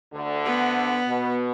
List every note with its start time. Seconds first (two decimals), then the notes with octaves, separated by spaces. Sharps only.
0.13 D2 D3
0.45 B3
1.07 B2